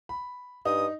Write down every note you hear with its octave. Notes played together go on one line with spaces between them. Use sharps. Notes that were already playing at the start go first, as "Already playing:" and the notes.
B5
G2 D#4 D#6